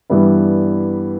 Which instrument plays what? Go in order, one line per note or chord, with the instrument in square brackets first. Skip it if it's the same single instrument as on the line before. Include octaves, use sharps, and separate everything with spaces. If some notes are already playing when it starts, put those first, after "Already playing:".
[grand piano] G2 E3 G3 B3 E4